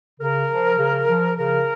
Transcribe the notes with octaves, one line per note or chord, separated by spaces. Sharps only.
C#3 A#4
F3
C#3
F3
C#3 A#4